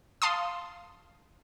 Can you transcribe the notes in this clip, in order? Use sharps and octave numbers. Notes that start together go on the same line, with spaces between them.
F5 A5 C6 D#6